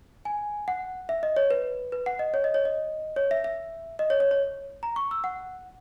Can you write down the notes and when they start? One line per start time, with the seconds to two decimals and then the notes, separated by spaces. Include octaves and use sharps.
0.25 G#5
0.68 F#5
1.09 E5
1.23 D#5
1.36 C#5
1.51 B4
1.92 B4
2.06 F#5
2.19 D#5
2.34 C#5
2.44 D#5
2.54 C#5
2.65 D#5
3.16 C#5
3.31 E5
3.44 E5
3.99 D#5
4.10 C#5
4.20 C#5
4.31 C#5
4.83 A#5
4.96 C#6
5.11 E6
5.24 F#5